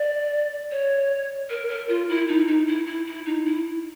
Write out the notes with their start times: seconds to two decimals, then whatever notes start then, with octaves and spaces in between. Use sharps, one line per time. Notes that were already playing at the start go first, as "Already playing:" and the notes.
Already playing: D5
0.71 C#5
1.50 A#4
1.69 A#4
1.89 F4
2.09 E4
2.28 D#4
2.48 D#4
2.67 E4
2.87 E4
3.06 E4
3.26 D#4
3.46 E4